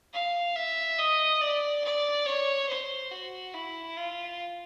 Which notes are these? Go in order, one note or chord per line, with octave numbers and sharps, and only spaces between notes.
F5
E5
D#5
D5
D5
C#5
C5
F#4
E4
F4